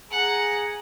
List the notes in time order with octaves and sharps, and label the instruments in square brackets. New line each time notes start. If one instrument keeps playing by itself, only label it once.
[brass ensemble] G#4 G#5 A#5 [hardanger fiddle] F#5